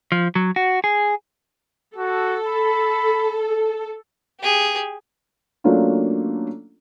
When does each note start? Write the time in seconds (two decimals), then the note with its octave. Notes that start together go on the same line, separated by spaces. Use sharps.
0.12 F3
0.35 F#3
0.56 F#4
0.84 G#4
1.96 F#4 A4
2.47 B5
4.40 G4 G#4
5.64 F#3 A3 A#3 C#4 D4 F4